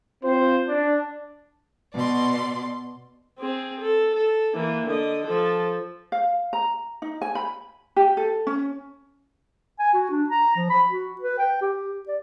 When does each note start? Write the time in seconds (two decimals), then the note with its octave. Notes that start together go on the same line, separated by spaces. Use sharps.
0.23 C4 F4 C5
0.68 D4
1.94 B2 D5 C6
3.39 C4 G#4
3.80 A4
4.15 A4
4.54 E3 A#3
4.87 D3 D#5
5.24 F3 A4
6.12 F5
6.53 A#5
7.02 D#4
7.22 G#5
7.35 B5
7.96 G4
8.17 A4
8.47 C#4
9.79 G#5
9.94 F#4
10.11 D4
10.30 A#5
10.56 F3
10.70 B5
10.90 F#4
11.21 B4
11.39 G5
11.62 G4
12.08 D5